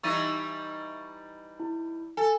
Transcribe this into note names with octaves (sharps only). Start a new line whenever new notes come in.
E3 G3 D#4 C#6 A6 D#7
E4
A4 G#5